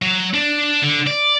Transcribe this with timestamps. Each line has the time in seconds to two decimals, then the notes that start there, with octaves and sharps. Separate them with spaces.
0.02 F#3
0.34 D4
0.82 D3
1.06 D5